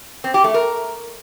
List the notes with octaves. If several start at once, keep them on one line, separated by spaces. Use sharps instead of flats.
C4
G4
A3
A#4